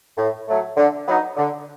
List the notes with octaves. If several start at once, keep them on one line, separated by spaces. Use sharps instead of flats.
A2
F#3 A3
D3
F#3 B3 D#4
D3